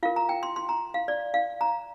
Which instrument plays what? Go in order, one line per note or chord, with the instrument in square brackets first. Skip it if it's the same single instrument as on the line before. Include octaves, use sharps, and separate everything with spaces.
[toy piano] F4 A#4 F5
A#5
G5
C6
C6
A#5
F5
D5
F5
A#5